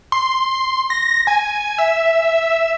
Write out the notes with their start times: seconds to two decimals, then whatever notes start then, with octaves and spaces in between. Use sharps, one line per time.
0.12 C6
0.90 A#6
1.27 G#5
1.78 E5